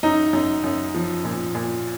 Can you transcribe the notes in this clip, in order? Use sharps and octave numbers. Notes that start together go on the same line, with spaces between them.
F#2 D#4
F#2
F#2
F3
A#2
A#2